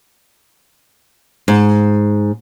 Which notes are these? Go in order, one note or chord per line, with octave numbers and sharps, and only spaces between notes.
G#2